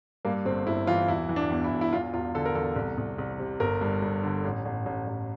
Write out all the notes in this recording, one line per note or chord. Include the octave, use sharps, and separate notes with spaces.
G2 A#3
G1 C4
G1 E4
E3 F4
E1 E4
E3
D4
E2
E4
E1
E4
E2 F4
E1 F4
D3 A4
A#4
E2 A4
C2
C2
C2
C3
G1 A#4
G2
G2
D3
A1
A1
A1
A1